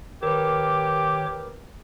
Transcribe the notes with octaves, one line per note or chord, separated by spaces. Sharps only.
D#3 G4 A#4 B4 C#5 D6